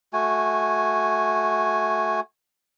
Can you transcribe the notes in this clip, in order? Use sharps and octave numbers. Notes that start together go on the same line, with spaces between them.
A3 F#4 G#5